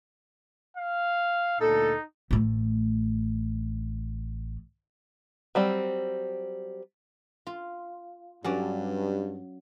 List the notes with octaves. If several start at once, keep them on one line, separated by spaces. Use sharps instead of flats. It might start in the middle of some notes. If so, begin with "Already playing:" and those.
F5
D2 A#2 D#4 A4
A1 A3
F#3 G3 C4
F4
G2 F#3 C#4 D5